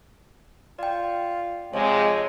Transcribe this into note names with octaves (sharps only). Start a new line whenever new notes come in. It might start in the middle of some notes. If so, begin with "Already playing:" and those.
F4 D5 G5
C3 F3 G#3 C#5 D#5